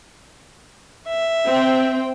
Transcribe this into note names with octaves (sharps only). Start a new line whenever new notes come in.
E5
C4 C5 G5